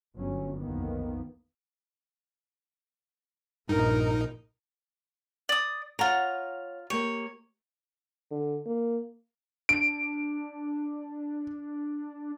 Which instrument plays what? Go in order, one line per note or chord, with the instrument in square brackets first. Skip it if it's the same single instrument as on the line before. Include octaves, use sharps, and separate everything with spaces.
[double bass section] G1 F#3 C#4
B1 F2 D#3 A#3 B3
[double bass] A#1 [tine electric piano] G2 [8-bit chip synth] D#4 [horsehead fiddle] A#4
[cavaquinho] D5 D#6
[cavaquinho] F4 A#5 [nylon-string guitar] C#5 F#5
[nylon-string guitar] A#3 G4 [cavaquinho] C#5
[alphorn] D3
A#3
[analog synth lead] D4 [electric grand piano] D7